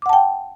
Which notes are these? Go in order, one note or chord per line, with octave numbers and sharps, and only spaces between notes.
F#5 G5 A5 D6